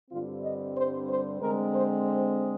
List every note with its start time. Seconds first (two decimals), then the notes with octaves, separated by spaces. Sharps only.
0.10 G2 D3 G3 C4 F4
0.42 D#5
0.76 C5
1.08 C5
1.40 D3 G#3 C4 A#4
1.74 C5
2.06 C5